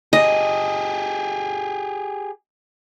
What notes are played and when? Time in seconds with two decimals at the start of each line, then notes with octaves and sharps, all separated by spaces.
0.13 G4 G#4 D#5